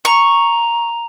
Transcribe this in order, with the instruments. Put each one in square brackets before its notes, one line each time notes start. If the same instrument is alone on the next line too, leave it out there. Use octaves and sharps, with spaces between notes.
[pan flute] A#5 [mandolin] C#6